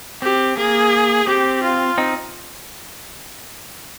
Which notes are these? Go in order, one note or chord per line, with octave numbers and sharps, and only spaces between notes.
C4 G4
A#3 G#4
C4 G4
F4
C4 D#4